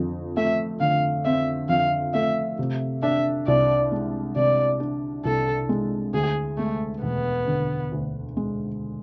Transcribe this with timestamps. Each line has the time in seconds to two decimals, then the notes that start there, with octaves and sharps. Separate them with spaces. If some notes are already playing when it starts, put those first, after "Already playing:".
Already playing: F2 D3
0.37 A3 E5
0.80 D3 F5
1.25 C4 E5
1.69 F2 F5
2.14 A3 E5
2.59 C3
3.03 D4 E5
3.47 C2 D5
3.92 G#3
4.36 C3 D5
4.80 D4
5.25 C2 A4
5.69 G#3
6.14 D2 G#4
6.58 G#3 A3
7.02 E1 B3
7.47 D3
7.91 D2
8.37 G#3